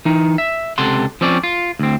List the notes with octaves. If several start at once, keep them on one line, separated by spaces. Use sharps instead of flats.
E3 D#4
E5
C#2 C3 A4 F#5 C6
F3 C4 C#4 D5
F4
D2 C4